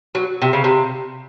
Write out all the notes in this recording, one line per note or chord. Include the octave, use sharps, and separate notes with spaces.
F#3
C3
C#3
C3